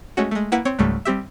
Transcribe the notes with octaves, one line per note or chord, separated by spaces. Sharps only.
G#3 A3 C#4 F#4
G#3 A3
A#3 E4 B4 F#5
C4 C#5
C#2 G#2 C#3 G3 A3
G3 C4 G4 E5